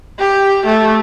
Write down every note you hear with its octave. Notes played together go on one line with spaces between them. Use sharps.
G4
A3